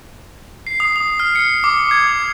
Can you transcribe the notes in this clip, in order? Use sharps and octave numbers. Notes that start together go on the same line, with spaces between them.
C7
D#6
D#6
F6
C#7
D6
G#6
D#6